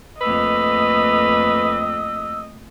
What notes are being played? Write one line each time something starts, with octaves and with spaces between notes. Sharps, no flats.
F2 A3 A#3 B4 D#5 E6